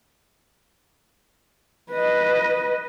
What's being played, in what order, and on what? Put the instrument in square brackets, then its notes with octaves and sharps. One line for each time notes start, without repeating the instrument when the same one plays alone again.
[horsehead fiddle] B4 D#5